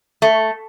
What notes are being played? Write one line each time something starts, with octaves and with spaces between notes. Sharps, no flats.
A3